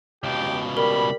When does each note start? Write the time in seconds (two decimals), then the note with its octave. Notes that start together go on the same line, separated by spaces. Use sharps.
0.23 C#2 B2 G4
0.77 G3 A#4 B5